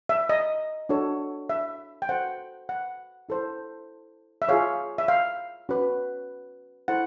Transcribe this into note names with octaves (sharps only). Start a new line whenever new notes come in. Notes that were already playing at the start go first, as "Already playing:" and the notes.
E5
D#5
D4 F#4 A4 C#5
E5
G5
F#4 A4 C5 F#5
F#5
E4 A4 C5
E5
F4 G#4 C#5 F5
E5
F5
C#4 F#4 B4
E4 A4 C5 F#5